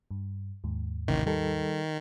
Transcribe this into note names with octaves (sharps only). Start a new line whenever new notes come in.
G2
D#2 G#2
A1 C3 D#3
D#3 G3 A4